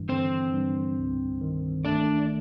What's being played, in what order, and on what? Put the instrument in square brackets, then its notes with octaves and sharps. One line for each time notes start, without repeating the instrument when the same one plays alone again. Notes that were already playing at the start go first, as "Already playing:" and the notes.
Already playing: [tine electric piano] G2 E3
[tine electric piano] D3 [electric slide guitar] C4 C5
[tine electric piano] G2
C2
D#3
[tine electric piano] A3 [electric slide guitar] D4 D5